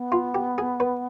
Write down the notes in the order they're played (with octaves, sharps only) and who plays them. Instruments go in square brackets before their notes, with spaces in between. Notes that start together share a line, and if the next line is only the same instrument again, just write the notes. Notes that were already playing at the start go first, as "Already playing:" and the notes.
Already playing: [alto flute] B3
[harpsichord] F4
G4
G#4
B4